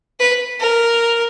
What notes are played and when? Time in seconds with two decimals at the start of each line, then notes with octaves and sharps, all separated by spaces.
0.20 B4
0.60 A#4